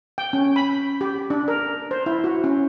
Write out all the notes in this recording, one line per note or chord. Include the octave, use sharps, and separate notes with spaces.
G5
C#4
B5
G4
D4
A#4
C5
E4
F#4
C#4